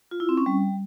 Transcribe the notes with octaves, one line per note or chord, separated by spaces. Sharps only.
F4
E4
C4
C#4
G3